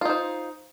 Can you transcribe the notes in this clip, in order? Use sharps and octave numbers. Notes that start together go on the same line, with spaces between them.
D#4 F4 C5